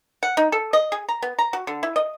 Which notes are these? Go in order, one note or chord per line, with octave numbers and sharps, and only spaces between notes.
F#5
D#4
A4
D#5
G#4
A#5
B3
A#5
F#4
D3
E4
D#5